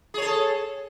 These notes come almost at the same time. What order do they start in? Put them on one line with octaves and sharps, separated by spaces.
G#4 C#5 A4